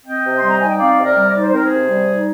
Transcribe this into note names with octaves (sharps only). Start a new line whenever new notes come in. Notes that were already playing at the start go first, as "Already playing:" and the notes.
C4 D#5 G5
C3
G3 C6
A#5
D#4 G#5
G5
C4 D5 F5
C3
A#4 D5
G3
D5
D#4
C5
C4 A#4
G#4 C5
C3
G3
D#4